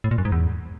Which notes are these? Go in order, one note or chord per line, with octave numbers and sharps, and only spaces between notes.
A2
A#2
F#2
G#2
E2